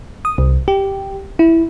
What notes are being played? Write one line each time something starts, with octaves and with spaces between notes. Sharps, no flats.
D#6
C2
G4
E4